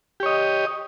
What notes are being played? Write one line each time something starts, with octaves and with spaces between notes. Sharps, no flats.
G4 C#5 D#5